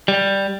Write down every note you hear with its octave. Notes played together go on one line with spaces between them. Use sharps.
G3